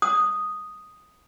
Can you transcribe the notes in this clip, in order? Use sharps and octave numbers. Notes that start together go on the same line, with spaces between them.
D#6